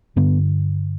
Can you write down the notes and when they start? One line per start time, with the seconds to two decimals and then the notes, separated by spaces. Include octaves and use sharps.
0.16 G2 D3 B3